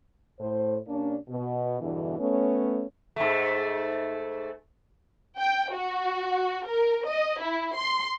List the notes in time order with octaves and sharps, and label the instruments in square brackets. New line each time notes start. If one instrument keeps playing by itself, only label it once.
[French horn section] A2 C5
C3 A#3 C#4 D4
B2
E2 G2 B2 D3 E3
A3 B3 C#4
[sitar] G#2 A3
[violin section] G5
F#4
A#4
D#5
E4
C6